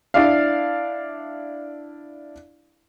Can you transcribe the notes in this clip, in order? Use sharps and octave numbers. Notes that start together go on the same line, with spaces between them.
D4 E4 D5 F5